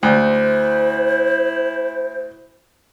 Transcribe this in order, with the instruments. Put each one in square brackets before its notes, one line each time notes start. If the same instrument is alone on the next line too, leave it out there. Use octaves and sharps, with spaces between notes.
[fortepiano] D2 [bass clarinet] E4 [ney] C5